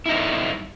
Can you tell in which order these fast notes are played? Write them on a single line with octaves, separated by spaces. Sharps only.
E4 D#4 G3